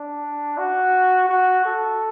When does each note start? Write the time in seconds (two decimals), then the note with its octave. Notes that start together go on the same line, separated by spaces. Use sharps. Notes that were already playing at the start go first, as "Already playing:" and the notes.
Already playing: D4
0.58 F#4
1.29 F#4
1.65 A4